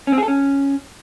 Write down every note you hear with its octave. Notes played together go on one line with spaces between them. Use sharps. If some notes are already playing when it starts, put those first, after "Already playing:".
C#4
C4
G#4
A4
C#4